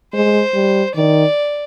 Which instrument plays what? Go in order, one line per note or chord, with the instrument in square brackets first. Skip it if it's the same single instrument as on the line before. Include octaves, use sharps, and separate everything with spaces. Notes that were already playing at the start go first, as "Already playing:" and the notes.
[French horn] G#3 [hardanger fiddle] C5
[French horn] G3
[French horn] D#3 [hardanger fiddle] D5